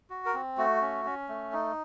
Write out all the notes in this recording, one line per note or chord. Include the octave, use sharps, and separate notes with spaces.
F#4
A#4
C4
A3 F#4
C#4
C#4
A3
D#4